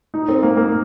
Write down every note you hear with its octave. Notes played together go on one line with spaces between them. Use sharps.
D#4
C4
A#3
A#3